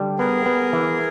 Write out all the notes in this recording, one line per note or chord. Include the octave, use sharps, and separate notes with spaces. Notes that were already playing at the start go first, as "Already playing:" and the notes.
Already playing: D3 G3
B3 G#4 A#4
B3
E3